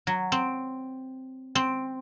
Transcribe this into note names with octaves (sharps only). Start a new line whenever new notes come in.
F#3
C4
C4